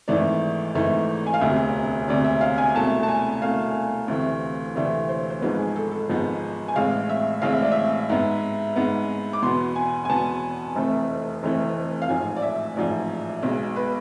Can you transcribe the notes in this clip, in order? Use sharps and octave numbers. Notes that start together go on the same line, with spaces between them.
G#1 G#2 E3 A3 D5
G#1 G#2 E3 A3
G#5
F5
E1 D2 C3 E5
E1 D2 C3 D5
E5
F5
G#5
C2 B2 A3 A5
A5
G#5
C2 B2 A3 F5
D2 C3 E3 A3 C4
D2 C3 E3 A3 C4 D5
C5
C5
G#1 G#2 F3 G#3 B3 B4
G#4
A4
A4
G#1 G#2 F3 G#3 B3
G#5
A1 A2 G#3 C4 F5
E5
A1 A2 G#3 C4 F5
E5
D5
E5
G#2 G#3 B3
G#2 G#3 B3
D6
E2 B2 B3 C6
G#5
G#5
E2 B2 B3 A5
F1 F2 E3 A3 C4
F1 F2 E3 A3 C4
F5
A1 G#2 F3 G#5
D5
E5
A1 G#2 F3 D5
B1 B2 G#3
B4